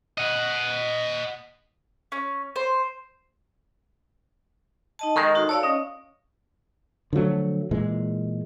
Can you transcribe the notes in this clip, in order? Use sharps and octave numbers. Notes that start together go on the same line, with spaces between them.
D#5 F#5
C#4
C5
D#4 D#5 A5
D#3 G#3 A4 A#4 C#6
D#4 F#4
A4 C#5 D5 F5
C#4 D#5
D3 F3 F#3 A3
A#2 E3 G#3